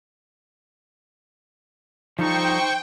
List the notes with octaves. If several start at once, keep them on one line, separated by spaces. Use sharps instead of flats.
F3 G3 D#4 A4 C5 G5 C#6